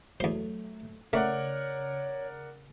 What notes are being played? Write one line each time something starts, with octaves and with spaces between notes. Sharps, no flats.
E2 F#3 A3 C5
C#3 A3 A#4 C#5 D5 F#5